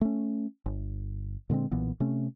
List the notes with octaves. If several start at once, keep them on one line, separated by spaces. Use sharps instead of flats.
A3 C#4
G1
A#2 D3 G#3 C4
B1 A#2 E3 B3
C3 A3 C#4